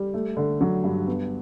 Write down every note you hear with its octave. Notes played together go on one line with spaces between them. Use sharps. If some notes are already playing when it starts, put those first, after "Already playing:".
Already playing: G3
A3
D3
F#3
G2
B3